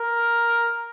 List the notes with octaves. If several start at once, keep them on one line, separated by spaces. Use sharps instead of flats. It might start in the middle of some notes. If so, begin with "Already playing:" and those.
Already playing: A#4